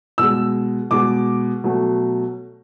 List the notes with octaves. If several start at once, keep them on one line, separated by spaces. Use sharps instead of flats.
B2 G#3 E6
B2 G#3 D6
B2 F#3 A3